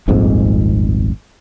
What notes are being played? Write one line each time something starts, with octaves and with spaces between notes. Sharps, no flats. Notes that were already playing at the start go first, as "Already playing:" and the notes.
D#1 G#1 F2 G#2